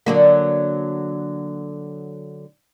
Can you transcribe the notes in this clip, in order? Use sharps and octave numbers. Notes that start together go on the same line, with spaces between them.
D3 F#3 A#3